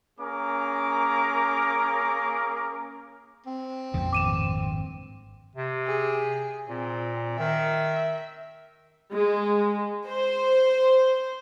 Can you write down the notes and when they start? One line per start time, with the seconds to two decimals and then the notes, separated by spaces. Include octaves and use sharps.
0.19 A#3 C#4 G#4 A#4 A#5 D6
3.46 C4
3.94 A#1 F2 A#2 C#3
4.13 G#1 G2 D6 D#7 E7
5.55 C3
5.87 G#4
6.69 A#2 C4
7.39 D#3 E5
9.12 G#3
10.07 C5